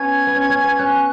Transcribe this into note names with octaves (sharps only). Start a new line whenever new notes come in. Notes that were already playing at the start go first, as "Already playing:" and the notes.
Already playing: B3 C#4 G#6
B3
C#4
C#4
B3
C#4 F#6